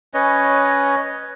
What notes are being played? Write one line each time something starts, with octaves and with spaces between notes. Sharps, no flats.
C#4 B4 C#5 D#5